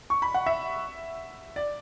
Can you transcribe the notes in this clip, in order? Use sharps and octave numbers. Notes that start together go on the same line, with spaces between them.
C#6
B5
F#5
E5
D5